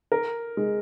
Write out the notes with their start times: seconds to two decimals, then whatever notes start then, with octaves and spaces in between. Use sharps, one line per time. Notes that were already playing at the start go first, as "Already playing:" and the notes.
0.12 A#4
0.57 G#3